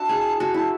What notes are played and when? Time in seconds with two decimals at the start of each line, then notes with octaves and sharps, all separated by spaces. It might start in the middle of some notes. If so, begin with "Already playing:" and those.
Already playing: D4 E4 F#4 A5
0.09 G#4
0.40 F#4 A5
0.54 E4 A5